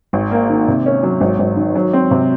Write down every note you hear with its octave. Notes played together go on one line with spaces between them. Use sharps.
G#1
A#3
D#3
C3
C#4
F#3
G#1
G#1
D#3
F#3
C4
C3